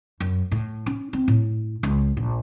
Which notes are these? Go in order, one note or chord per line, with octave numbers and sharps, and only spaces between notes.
F#2
A2
C#4
C4
A2
C#2
A#1